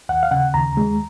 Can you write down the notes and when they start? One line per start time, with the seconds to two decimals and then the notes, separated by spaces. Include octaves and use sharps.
0.09 D#2 F#5
0.23 F5
0.31 C#3 F#5
0.54 D#2 A#5
0.77 G#3